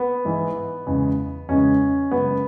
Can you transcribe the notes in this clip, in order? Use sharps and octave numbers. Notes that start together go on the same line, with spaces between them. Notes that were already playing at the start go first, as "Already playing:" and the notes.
Already playing: B3
G#2 E3 G#3
E2 C#3 G#3
E2 C#3 G#3 C#4
F#2 C#3 G#3 B3